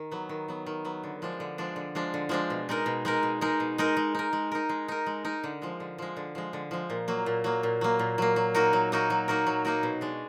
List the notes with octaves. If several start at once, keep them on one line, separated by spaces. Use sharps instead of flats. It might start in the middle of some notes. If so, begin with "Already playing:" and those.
Already playing: D#3
F#3 B3
D#3
F#3 B3
D#3
F#3 B3
D3
F3 G#3 D4
D3
F3 G#3 D4
D3
F3 G#3 D4
D3
F3 G#3 D4
B2
G#3 D#4 A#4
B2
G#3 D#4 A#4
B2
G#3 D#4 A#4
B2
G#3 D#4 A#4
G#3
D#4 A#4
G#3
D#4 A#4
G#3
D#4 A#4
G#3
D#4 A#4
D3
F3 G#3
D3
F3 G#3
D3
F3 G#3
D3
F3 G#3
A#2
F#3 A#3
A#2
F#3 A#3
A#2
F#3 A#3
A#2
F#3 A#3
F#3
A#3 D#4 F#4 A#4
F#3
A#3 D#4 F#4 A#4
F#3
A#3 D#4 F#4 A#4
F#3
A#3 D#4 F#4 A#4
B2
G#3 D4